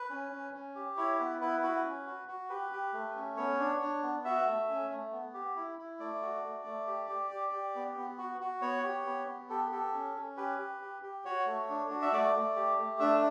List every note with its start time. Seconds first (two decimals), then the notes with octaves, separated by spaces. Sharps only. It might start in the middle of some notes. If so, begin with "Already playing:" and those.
Already playing: B4
0.10 C#4
0.31 C#4
0.54 C#4
0.75 G4
0.97 E4 C#5
1.19 B3 B4
1.41 E4 B4
1.63 F#4 B4
1.84 C#4
2.07 F#4
2.28 F#4
2.50 G4 B4
2.73 G4
2.93 A3
3.16 C#4
3.37 B3 C#5
3.59 D4
3.82 D4
4.03 B3
4.25 F#4 E5
4.46 A3
4.69 C#4
4.90 A3
5.12 B3
5.34 G4
5.56 E4
5.79 E4
6.00 A3 D5
6.22 F#4
6.43 A3
6.65 A3
6.87 G4
7.09 G4
7.30 G4
7.52 G4
7.75 B3
7.97 B3
8.18 F#4
8.41 F#4
8.62 B3 C#5
8.84 G4
9.06 B3
9.27 B3
9.49 G4 A4
9.72 G4 A4
9.93 C#4
10.16 C#4
10.37 G4 B4
10.58 G4
10.82 G4
11.02 G4
11.25 F#4 C#5
11.46 A3
11.69 D4
11.90 F#4
12.02 E5
12.13 A3 D5
12.34 A3
12.56 G4
12.78 A3
12.99 D4 E5